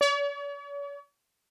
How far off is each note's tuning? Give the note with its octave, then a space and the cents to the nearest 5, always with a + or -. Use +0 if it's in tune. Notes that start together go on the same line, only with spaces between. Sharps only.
C#5 +45